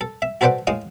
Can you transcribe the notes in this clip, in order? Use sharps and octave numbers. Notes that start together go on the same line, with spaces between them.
A4
E5
F#4 A4 B4 C5 D5 F#5
A2 G#3 F5 D#6